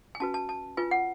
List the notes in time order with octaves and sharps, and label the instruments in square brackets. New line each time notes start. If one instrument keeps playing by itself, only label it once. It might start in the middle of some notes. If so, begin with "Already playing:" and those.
[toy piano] G#5
C#4 F#4 B4 A5
A5
A5
F4 B4 G#5
F#5